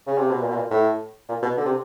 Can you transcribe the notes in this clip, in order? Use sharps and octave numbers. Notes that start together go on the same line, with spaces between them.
C#3
C3
B2
A#2
B2
A#2
A2
A#2
B2
D3
C3